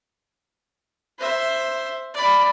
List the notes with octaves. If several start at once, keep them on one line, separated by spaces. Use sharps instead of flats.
C5 E5
D5 B5